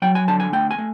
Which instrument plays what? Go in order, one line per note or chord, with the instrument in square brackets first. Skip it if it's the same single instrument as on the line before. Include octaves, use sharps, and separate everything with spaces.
[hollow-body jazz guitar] F#3 G5
G#5
D3 A5
G#5
A3 G5
G#5
A3